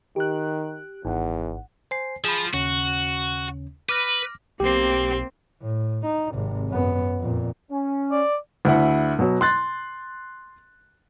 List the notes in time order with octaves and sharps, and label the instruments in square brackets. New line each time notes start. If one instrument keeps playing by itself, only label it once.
[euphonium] D#3 [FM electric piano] G4 F#6
[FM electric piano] G#1 F#5 [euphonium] E2
[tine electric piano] C5 G#5 C7
[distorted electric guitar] F3 [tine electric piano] G#4 B5
[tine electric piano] D#2 C#3 C#4 [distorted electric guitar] F#4
[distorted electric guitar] B4 [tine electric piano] D6 F6 A#6
[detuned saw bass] B1 [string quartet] A#3 C4 [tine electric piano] G4
[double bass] A2
D#4
G#1 C3
F#2 B3
F2 A#2
[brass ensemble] C#4
[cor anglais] D5
[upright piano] D2 E4 F#5
B2 F#3
C6 F#6 A6